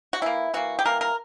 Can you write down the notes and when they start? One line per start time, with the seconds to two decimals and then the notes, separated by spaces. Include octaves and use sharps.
0.13 F#4
0.21 E3 A#3 E4
0.54 E3 A#3 F#4
0.79 G4
0.85 E3 G3 A#3 A#4
1.01 A#4